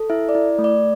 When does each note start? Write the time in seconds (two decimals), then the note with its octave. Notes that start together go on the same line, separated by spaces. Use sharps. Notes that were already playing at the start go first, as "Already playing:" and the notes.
Already playing: A4
0.10 E4 E5
0.29 D5
0.35 E4
0.59 A3
0.64 D5